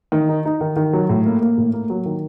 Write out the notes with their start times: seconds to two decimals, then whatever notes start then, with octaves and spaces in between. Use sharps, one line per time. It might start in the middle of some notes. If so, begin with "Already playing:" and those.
0.12 D#3
0.29 D#4
0.45 D#4
0.61 D#3
0.76 D#3
0.93 F#3
1.09 A2
1.26 A#3
1.41 A#3
1.58 A2
1.73 A#3
1.90 F#3
2.06 D#3